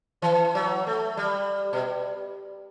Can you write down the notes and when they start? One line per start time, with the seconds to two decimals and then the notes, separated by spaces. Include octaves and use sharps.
0.22 E3
0.55 F#3
0.87 A3
1.17 G3
1.73 B2